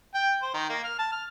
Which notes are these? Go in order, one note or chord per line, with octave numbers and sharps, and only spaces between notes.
G5
C5
D#3
A#3
F6
A5
F6